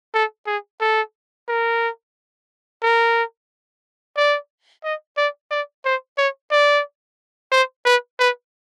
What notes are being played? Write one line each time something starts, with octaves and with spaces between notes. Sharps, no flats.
A4
G#4
A4
A#4
A#4
D5
D#5
D5
D5
C5
C#5
D5
C5
B4
B4